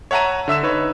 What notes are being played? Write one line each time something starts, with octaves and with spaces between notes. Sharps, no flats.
C#5 E5 F#5 A5 A#5 D#7
D3 E5 E6 E7
D#4 B4 C#5